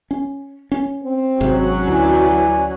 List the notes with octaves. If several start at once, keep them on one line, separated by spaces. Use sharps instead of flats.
C#4
C#4
C4
G#1 G#2 C3 F#3 C#4 F#4
D2 E3 D5 G#5